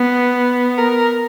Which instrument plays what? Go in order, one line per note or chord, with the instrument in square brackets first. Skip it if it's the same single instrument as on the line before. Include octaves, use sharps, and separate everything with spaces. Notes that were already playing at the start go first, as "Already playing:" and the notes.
Already playing: [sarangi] B3
A#4